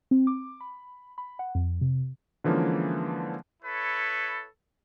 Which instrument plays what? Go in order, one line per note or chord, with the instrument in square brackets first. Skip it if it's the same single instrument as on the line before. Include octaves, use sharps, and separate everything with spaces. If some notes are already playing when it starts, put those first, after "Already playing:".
[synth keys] C4
D6
B5
B5
F#5
F2
C3
[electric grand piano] D3 E3 F3 G#3 A#3 C#4
[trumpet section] E4 A4 B4 C#5